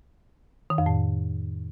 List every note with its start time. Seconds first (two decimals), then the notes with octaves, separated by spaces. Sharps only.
0.70 D#3
0.78 F2
0.86 A2